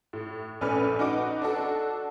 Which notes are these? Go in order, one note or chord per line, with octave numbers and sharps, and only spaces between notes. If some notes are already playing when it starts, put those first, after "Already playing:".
A2
A#1 A3 C#4 B4 D5 F6
D#4 F#4 B4 D6 D7
D4 F#4 A4